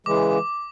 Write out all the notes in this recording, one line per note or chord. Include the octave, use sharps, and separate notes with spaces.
C#3 E3 G#3 D6